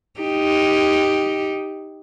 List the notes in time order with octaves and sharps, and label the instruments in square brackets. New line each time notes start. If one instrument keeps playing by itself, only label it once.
[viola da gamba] D#4 G4